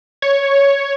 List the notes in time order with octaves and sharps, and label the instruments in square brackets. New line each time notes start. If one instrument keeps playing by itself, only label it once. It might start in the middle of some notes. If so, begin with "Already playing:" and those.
[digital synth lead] C#5